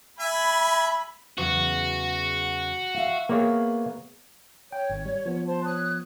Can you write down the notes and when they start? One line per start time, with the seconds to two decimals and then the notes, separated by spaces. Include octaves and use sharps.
0.20 E5 G#5 B5
1.38 E2 C#3 F#3 F#4
2.94 E5 F5
3.29 A#3 B3 G#4 C#5
4.72 C#5 G5
4.90 G#1
5.05 G3
5.26 F3 B3
5.46 C5 A5
5.64 C#5 D#6 F#6